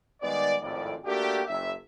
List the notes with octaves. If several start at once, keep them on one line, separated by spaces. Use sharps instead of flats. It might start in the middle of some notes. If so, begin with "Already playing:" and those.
D#3 G3 G#3 B3 D5
G#1 F2 A2 D5
A3 A#3 D4 F#4 G4
F#1 E5